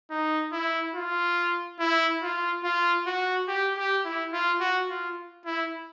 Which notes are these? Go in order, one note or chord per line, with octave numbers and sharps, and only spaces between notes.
D#4
E4
F4
E4
F4
F4
F#4
G4
G4
E4
F4
F#4
F4
E4